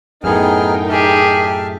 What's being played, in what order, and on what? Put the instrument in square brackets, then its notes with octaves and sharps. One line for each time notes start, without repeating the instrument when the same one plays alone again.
[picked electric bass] F#2 A2 [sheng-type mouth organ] B3 G#4 F6 [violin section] D#4 A#4 G5
[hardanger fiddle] G4 G#4 [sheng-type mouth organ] E5 A5 F6